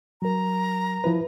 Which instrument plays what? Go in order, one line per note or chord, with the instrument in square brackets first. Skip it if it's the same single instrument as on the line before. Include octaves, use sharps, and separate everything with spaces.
[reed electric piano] F#3 A#4 [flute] A#5
[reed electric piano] F3 E4 B4